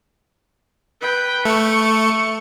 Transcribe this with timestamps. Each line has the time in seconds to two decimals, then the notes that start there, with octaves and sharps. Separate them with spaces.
1.01 B4 G5
1.45 A3 C#6